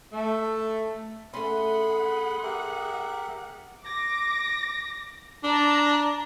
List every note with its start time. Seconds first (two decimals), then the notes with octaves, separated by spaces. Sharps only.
0.13 A3
1.34 A3 C#4 G#4 F#5 B5 C6
2.43 G4 A#4 E5
3.81 D6 A#6
5.44 D4 A5 A#5